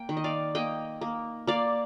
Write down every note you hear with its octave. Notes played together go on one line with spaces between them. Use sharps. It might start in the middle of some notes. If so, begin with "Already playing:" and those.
Already playing: A#3 G5
D#3
D#5
D5 F5
A#3 D#5 G5
A#3
A#3 D5 F5